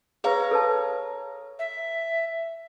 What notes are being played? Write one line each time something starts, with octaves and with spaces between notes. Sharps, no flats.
G#4 B4 C#5 F5 A#5
A4 B4 A5
E5